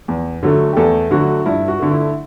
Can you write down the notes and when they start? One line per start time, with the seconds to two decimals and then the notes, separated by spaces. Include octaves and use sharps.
0.08 E2
0.43 D3 F#3 A3
0.73 G4
0.77 E2 A3 A4
1.11 D3 F#3 A3 F#4
1.46 G2 E4
1.68 F#4
1.80 D3 A3
1.91 E4